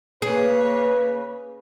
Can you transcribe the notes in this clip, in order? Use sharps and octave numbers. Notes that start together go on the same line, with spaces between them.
C#3 A#3 G#4 B4 C#5